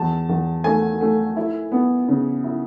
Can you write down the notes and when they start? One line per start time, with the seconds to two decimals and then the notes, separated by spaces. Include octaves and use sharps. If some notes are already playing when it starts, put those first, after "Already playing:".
Already playing: E2 A5
0.29 E2
0.64 A3 G#5
1.01 A3
1.37 E4
1.72 B3
2.08 C#3
2.44 E4